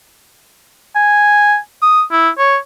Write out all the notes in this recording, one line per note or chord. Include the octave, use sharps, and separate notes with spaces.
G#5
D#6
E4
C#5